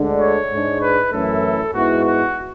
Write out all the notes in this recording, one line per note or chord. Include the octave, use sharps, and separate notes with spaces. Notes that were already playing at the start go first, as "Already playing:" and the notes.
Already playing: D2 D3 G#3 D4
C#5
G#2 G#3 D4
B4
F#2 E3 A3 C#4 E4 A4
G#2 G#3 B3 E4 F#4
F#4